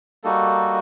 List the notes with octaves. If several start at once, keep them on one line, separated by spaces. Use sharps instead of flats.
G3 A#3 D#4 F#4 A4